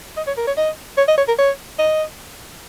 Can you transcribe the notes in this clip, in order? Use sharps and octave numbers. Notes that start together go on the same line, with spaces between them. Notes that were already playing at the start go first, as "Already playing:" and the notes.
D#5
C#5
A#4
C#5
D#5
C#5
D#5
C#5
A#4
C#5
D#5